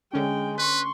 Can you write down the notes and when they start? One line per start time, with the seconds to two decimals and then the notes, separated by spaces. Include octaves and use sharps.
0.13 D3 G#3 C#4 G5
0.58 B4 C6 C#6